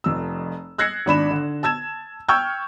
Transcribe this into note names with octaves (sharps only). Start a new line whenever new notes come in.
F1 F2 E6
E6 F#6 G#6 A#6 C7 C#7
G#1 D4 B5 E7
D3
A5 E6 G#6 E7
G5 C#6 E6 F6 G6 G#6